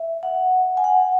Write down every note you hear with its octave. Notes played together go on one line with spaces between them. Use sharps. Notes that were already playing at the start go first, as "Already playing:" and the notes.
Already playing: E5
F#5
G#5
F#5